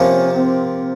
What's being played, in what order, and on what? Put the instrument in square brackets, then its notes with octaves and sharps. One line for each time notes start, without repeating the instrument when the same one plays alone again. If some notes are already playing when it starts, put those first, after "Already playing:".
Already playing: [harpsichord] C3 F3 A#3 [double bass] C#4
[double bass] C4